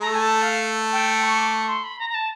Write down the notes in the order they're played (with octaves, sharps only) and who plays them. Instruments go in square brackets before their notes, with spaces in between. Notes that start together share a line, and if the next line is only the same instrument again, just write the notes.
[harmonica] A3 A4 [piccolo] A#5
[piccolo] G#5
A5
F5
G5
C#6
D6
C#6
C6
B5
A#5
A#5
A5